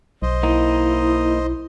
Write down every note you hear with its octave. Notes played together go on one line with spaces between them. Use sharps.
B1 C5 D#5
A#3 D#4 E4